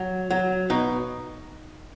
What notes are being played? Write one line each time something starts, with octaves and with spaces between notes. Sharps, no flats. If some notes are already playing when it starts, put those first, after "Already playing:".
Already playing: F#3
F#3
B2 D#4